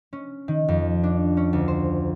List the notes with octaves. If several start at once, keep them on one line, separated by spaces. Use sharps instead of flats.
C#4
D#3
F2
D4
C#4
D2
C5